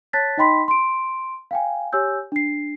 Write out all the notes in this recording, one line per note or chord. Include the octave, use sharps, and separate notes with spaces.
C#5 A5 F#6 A6 B6
D#4 D#5 G5 B5 C6 B6
C6 D7
F5 G5 G#5
G4 C#5 G#5 E6 G6
D4 C7